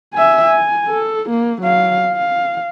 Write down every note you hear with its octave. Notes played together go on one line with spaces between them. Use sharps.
E5 G#5
G#5
A4
A#3
F#3 F5
F5